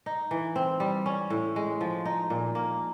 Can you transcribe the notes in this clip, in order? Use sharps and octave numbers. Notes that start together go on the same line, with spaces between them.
D#4
E3
C4
G3
C#4
A2
G#3
F3
D#4
A#2
A#3